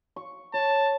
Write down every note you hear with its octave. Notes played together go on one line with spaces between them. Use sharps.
C#6
C#5 A5